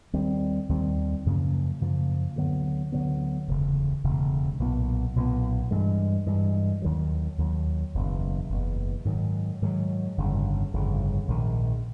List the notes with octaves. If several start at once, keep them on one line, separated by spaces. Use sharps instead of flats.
D#2 D#3 G3 C4
D#2 D#3 G3 C4
F#2 C#3 F3 A#3
F#2 C#3 F3 A#3
D2 D3 F#3 B3
D2 D3 F#3 B3
E1 D2 C#3
E1 D2 C#3
B1 A#2 F#3 B3
B1 A#2 F#3 B3
G2 E3 G#3
G2 E3 G#3
D#2 D#3 F#3
D#2 D#3 F#3
F#1 E2 B2
F#1 E2 B2
G#2 D#3 F#3
G#2 D#3 F#3
G1 F2 C#3
G1 F2 C#3
A#1 G#2 D#3